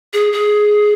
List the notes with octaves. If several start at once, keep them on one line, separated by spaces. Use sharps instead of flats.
G#4
G#4